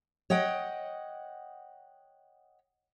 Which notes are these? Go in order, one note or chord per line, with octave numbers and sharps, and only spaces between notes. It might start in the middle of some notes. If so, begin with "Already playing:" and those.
C#5 D#5 F#5 G5